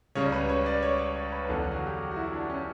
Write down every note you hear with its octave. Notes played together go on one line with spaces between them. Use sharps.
C#2 C#3 G3 C#5
B4
C#5
D5
C#5
C#5
C#5
B4
E2 D3 F#3 A4
F#4
G4
F#4
F#4
E4
D4
C#4